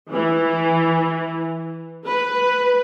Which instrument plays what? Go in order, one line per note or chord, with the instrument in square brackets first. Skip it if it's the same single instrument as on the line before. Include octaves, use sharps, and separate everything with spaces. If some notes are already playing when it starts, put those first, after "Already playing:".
[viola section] E3
B4